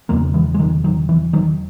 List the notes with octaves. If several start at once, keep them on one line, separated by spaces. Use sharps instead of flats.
E1 E2 C#3 F#3 A#3
E3 G#3
G#3
D#3 F#3
D#3 F#3
E3
D#3 F#3